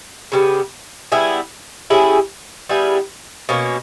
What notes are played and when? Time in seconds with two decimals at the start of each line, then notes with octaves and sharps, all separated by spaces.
0.32 C#3 G3 B3
1.12 G3 B3 E4 G#4
1.90 G3 C#4 E4 G#4
2.69 G3 B3 E4 G#4
3.49 B2 A#3 C#4